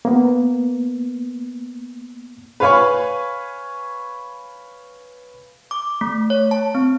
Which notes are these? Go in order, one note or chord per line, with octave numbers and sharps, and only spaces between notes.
A#3 B3
B4 C#5 F5 G#5 B5 C#6
D6
A3
C#5
A5
C4